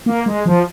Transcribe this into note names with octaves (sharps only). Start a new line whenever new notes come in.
A#3
G#3
F3